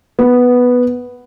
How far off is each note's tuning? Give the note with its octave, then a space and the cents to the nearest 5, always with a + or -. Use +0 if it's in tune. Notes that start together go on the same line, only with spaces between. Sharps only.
B3 +0